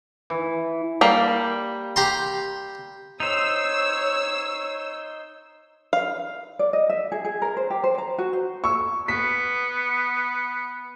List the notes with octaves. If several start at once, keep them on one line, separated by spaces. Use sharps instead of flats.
E3
G3 A#3
G4 A#5 C6
D#4 C5 C#5 E6
F5
D5
D#5
E5
G#4
G#4
A#4
C5
G4
C5
A#5
F#4
C5
C#6 E6
B3 B6